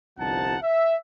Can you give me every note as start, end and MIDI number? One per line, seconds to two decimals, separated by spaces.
0.19 0.56 31
0.19 0.56 36
0.19 0.56 53
0.19 0.56 63
0.19 0.56 78
0.19 0.56 81
0.62 0.96 76